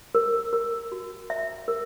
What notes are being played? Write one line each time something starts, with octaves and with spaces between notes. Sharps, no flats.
A#4
A#4
F#4
E5
A#4